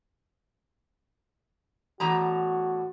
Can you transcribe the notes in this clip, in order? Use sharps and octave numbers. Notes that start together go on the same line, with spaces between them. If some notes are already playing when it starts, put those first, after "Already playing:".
E2 A2 F#4 A#5